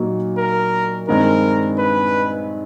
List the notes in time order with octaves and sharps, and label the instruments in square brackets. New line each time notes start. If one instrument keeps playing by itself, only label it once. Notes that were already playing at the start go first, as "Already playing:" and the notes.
Already playing: [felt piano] A#2 F#3 A#3 D#4
[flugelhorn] A#4
[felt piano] G2 D#3 G#3 C4 [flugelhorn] A#4
[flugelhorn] B4